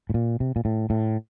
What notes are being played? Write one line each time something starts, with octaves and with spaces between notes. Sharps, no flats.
A2
A#2
C3
A#2
A2
A2